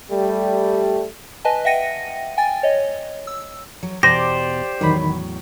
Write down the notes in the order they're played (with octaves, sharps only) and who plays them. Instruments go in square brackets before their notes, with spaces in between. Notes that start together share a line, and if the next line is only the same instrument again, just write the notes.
[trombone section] G3 A3
[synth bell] B4 D#5 G#5 A5
E5 F#5 G5 A#6 C#7 D#7
G5 G#5 A6
C#5 D#5
E6
[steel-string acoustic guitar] F#3
[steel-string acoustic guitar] E2 B2 A#5 [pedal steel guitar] G4 C5 D5 [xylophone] A#6
[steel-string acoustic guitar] E2 A2 F#3 [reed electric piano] D#3 B5